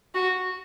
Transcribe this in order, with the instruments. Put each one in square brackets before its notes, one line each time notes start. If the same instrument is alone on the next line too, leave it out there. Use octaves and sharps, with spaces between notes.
[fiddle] F#4